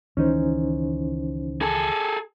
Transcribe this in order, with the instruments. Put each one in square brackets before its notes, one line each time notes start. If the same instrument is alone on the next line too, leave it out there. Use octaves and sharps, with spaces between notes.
[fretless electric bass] C#2 D#3 E3 [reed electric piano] C#4 D#4 C5
[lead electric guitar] G#4 A4